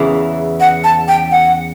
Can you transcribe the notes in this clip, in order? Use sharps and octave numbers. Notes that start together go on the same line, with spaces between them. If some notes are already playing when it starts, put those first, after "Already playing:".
Already playing: E2 C#3 E3
F#5
A5
G5
F#5